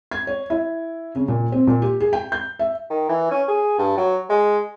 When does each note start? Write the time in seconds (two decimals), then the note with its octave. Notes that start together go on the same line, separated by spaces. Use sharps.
0.11 G#6
0.27 C#5
0.50 E4
1.15 C#3
1.28 A#2
1.52 C4
1.67 A#2
1.82 G4
2.00 G#4
2.13 G5
2.32 G6
2.59 E5
2.90 D#3
3.09 E3
3.31 C#4
3.48 G#4
3.79 G2
3.98 F#3
4.30 G#3